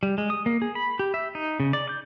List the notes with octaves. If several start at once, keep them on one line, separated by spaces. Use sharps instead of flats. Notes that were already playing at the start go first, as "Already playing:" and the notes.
G3
G#3
D#6
A#3
G#4
B5
G4
E5
D#4
C#3
D5
G6